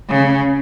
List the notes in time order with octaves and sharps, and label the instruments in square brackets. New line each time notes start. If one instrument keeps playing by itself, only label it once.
[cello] C#3